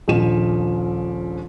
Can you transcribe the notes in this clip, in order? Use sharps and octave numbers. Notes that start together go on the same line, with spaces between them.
D#1 A#1 F3 E7